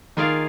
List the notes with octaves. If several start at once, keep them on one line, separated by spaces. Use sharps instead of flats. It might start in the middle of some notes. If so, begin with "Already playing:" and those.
D#3 A#3 F4 G#4 D5 F5